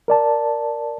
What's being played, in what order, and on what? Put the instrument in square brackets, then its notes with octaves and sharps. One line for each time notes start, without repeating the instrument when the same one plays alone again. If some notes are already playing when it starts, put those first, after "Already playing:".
[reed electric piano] A#4 D5 A5